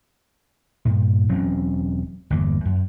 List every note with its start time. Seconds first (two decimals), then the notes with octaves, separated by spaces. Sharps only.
0.85 G2 A#2
1.29 E1 F#3 C4 C#4
2.30 G1 E2 A#3
2.65 F#2